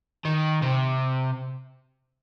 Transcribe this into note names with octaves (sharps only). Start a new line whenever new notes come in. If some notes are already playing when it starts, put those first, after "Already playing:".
D#3
C3